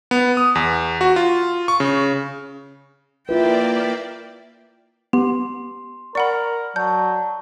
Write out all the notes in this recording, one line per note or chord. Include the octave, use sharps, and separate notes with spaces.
B3
D#6
E2
F#4
F4
C#6
C#3
A#3 E4 F4 B4 D5 E5 G5
B3 G4 C6
A#4 D5 F#5 B5 C#6
F#3 D5 A5 G6